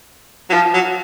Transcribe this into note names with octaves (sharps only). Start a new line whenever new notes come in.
F#3
F3
F#3